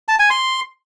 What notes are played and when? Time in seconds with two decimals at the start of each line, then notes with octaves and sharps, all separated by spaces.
0.08 A5
0.19 G#5
0.30 C6